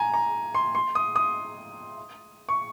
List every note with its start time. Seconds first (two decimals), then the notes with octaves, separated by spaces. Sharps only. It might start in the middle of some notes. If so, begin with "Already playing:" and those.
Already playing: G#5 A#5
0.14 A#5
0.55 C6
0.75 C6
0.95 D#6
1.16 D#6
2.49 C#6